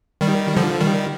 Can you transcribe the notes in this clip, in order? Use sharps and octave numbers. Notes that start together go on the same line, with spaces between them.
D#3 G3
D3 F3
D#3 G3